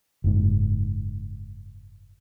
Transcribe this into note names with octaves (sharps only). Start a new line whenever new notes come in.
F#1 G#2